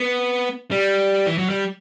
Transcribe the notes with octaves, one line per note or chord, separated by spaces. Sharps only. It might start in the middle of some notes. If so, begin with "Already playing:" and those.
Already playing: B3
G3
E3
F#3
G3